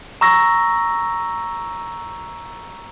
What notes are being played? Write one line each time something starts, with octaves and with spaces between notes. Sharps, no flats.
A#5 C#6 E6 A#6